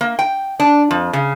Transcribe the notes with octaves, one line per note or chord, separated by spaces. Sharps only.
A#3
G5
D4
F2
C#3